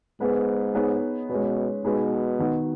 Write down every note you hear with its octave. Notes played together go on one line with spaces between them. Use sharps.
G#2 B3 G#4 B4
B3 D#4 G#4 C#5
B2 G#3 C#4 B4
B2 G#3 D#4 G#4 B4
D#3 B3 F#4